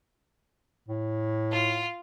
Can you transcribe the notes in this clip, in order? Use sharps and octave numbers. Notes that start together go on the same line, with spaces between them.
A2
F4 F5